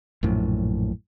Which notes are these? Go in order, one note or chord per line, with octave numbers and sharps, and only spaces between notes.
A#1 F#2 A2